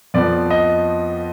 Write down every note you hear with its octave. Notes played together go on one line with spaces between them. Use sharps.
F2 F3 B3 D5
D#5